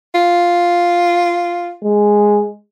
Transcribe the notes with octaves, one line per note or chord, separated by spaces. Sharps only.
F4
G#3